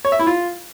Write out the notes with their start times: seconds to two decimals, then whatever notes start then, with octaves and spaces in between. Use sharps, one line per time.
0.05 C#5
0.12 E5
0.19 E4
0.27 F4